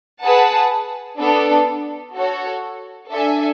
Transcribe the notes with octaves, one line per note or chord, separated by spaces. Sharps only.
G#4 B4 F#5 A5
B3 D4 A4
F#4 A4 C#5
D4 A4 E5 G#5